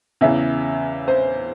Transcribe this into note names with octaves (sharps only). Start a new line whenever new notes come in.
E2 C#3 E3 E5
C5